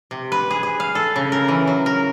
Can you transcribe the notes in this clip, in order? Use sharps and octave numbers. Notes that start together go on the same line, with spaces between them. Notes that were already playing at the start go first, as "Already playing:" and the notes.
C3
B4
G#4
G#4
F5
A4
C#3
A#4
E3
F#3
A#4